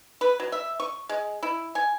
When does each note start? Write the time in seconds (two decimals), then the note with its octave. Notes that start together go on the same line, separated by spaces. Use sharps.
0.21 B4
0.40 F#3
0.52 E5
0.80 C#6
1.09 G#3
1.43 E4
1.75 G#5